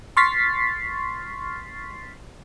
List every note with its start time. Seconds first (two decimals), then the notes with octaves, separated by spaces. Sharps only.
0.17 C6 C#6 F6 A6 B6 C7